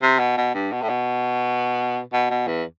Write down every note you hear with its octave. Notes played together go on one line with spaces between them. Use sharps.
C3
B2
B2
G2
B2
A2
B2
B2
B2
E2